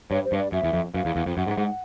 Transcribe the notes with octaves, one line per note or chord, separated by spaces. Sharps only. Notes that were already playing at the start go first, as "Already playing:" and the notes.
G2 C#5
C5
G2
D5
F#2 E5
E2
F2
F#2 F5
E2
E2
F2
F#2 F#5
G#2
G#2